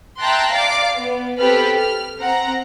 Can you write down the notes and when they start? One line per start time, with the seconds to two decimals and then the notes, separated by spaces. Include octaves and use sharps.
0.19 E5 G5 A5 A#5 C6 F#6
0.53 D5 F5 D6 C7
0.98 B3
1.38 C4 G4 A4 B4 B5 F6
1.78 F6
2.19 C4 F#5 A#5